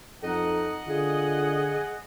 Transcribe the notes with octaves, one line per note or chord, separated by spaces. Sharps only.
F2 D#4 A4 D#5 F#5
D3 F4 G#4